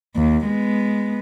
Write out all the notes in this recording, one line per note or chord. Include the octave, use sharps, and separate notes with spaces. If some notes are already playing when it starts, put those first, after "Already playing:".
D#2
G#3 B3